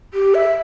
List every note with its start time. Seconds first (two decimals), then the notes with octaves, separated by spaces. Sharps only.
0.14 G4
0.34 E5